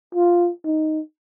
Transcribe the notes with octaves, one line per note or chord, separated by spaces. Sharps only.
F4
D#4